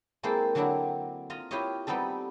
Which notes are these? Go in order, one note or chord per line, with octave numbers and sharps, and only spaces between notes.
G#3 A#3 C4 E4 A4 C5
D3 F#3 C4 D4 E4 F#5
F4 D#5 A#5
E4 F4 G4 C5 C#5 D#5
G3 B3 C4 D#4 A4